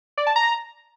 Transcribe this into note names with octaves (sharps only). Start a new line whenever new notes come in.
D5
A5
A#5